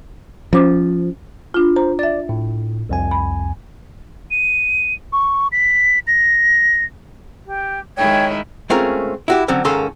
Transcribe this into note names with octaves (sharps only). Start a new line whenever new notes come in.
F3 C#4 C5 D6
D4 F4
C5 A#5
D5 E5 A6
A2
C2 F2 G#5
B5
D#7
C#6
B6
A#6
G4
D#3 G#3 E4 C#5 G5 G#6
G#3 A3 C4 C#4 F4 A#4
E4 F#4 G4
D3 F#3 C4 C#4
G#2 D#3 A#3 C#4 A4 C6